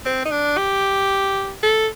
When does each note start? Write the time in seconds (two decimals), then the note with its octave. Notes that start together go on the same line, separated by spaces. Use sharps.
0.05 C4
0.25 D#4
0.31 D4
0.57 G4
1.63 A4